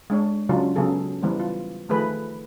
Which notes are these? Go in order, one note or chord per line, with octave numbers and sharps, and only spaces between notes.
G#3 D4 C#5
C#3 F#3 C#4 D4 F4
C#3 F#3 B3 G#4 A4
E3 G3 B3 C5
F4
D#3 F3 A3 G#4 B4